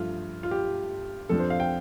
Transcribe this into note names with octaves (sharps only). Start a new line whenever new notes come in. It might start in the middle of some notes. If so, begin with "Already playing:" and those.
Already playing: G2 F3 A3 F4
F4
G4
F2 F3 D4 A4
C5
F5
G5